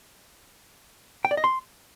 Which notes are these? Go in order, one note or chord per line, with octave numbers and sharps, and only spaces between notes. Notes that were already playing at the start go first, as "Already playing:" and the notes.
G5
D5
D#5
C6